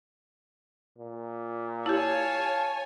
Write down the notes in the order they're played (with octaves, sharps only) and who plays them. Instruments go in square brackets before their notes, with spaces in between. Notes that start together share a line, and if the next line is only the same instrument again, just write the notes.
[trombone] A#2
[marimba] E4 G4 [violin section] C#5 G#5 [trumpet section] F5 A5